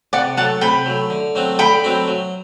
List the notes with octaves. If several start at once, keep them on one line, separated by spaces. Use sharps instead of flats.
C3 D5 F#5
F#3 A3 F#5 A5
C3 G5 B5
F#3 A3
D3
F#3 A3 C4 F#4
D3 G5 B5
F#3 A3 C4 F#4
F#3